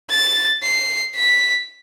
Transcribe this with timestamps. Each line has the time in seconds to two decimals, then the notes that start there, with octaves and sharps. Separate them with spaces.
0.10 A6
0.63 C7
1.16 B6